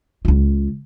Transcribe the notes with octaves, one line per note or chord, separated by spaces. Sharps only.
C#2 F4